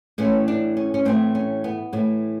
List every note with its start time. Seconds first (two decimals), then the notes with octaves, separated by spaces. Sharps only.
0.18 A2 E3 C#4
0.48 D4
0.77 C#4
0.94 C#4
1.05 A2 E3 C4
1.35 C#4
1.64 B3
1.93 A2 F#3
1.96 E3